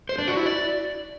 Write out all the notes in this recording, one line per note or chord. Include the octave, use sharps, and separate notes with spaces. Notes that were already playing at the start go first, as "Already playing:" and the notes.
C5
D4
F#4
E4
D5